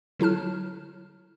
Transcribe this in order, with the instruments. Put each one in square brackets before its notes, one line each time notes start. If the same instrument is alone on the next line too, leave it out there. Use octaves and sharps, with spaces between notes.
[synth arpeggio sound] D3 F#3 E4 A5 F6